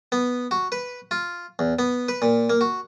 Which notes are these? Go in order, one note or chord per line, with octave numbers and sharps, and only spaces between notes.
B3
F#4
B4
F4
E2
B3
B4
A#2
A#3
F#4